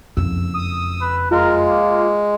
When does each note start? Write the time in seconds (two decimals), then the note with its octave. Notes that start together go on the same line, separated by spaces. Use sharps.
0.17 F#1 F2 E6
0.54 D#6
1.01 B4
1.31 G#3 F4 A#4
1.68 A#3